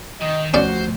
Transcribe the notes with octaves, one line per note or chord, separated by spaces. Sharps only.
D#3 D#5
D2 F3 A3 C#4 F#4 C5 D5